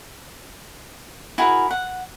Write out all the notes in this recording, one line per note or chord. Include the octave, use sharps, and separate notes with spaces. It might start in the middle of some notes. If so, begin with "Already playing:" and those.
E4 F#4 G#4 A#4
F#5